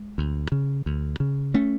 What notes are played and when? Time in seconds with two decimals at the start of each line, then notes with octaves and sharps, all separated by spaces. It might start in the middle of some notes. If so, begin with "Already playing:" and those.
Already playing: G#3
0.18 D2
0.52 C#3
0.86 D2
1.20 C#3
1.54 A3 C#4